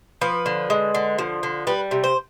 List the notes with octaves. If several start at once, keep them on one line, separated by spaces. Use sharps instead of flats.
F3 B4
D3
G#3
D3
F3
D3
G3 B4
C3
C5